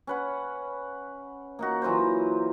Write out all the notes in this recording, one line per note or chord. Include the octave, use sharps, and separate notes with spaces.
C#4 B4 F#5
A#3 D#4 F#4
E3 F#3 F4 C5